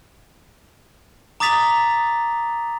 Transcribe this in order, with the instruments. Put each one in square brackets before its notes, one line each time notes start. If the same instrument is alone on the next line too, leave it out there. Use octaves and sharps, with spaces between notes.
[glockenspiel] A#5 D6 D#6 A6 B6 F7